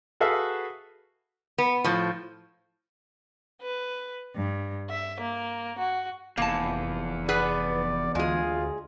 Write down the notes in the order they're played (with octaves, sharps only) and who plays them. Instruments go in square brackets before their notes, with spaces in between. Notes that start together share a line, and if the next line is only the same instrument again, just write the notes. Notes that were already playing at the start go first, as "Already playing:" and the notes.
[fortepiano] F#4 G#4 A4 B4 E5 F5
[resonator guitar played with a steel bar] B3
A2 F3
[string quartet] B4
G2
E5
A#3
F#4
[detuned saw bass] F1 [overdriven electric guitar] E2 [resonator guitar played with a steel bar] A#3 A5
[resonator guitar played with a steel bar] B3 G#4 B4 [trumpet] D5
[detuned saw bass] D2 [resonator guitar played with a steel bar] G#3 G#4 [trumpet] F4